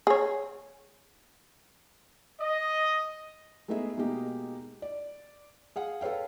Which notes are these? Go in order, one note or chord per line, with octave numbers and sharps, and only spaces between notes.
G#4 C#5
D#5
G#3 A3 B3 D#4 G#4 E5
B2 G#3 A#3 D#4 G4
D5
G#4 F5 F#5
A4 B4 C#5 F5 G5